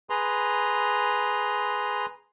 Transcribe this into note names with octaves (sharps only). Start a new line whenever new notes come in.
G#4 B4 A#5 C6